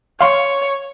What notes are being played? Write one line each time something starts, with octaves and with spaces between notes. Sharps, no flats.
C#5 F5 C6 C#6